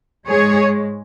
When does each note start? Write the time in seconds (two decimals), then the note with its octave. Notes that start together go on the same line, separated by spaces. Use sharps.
0.28 G#2 G#3 G#4 C#5